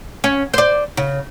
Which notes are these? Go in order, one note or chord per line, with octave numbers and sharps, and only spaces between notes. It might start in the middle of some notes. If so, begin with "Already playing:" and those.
C#4
C5 D5
C#3